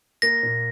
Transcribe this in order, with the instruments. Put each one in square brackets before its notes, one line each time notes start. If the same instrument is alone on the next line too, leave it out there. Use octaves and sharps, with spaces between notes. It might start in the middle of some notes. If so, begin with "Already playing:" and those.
[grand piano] A#3 [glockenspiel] A#6
[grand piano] A#2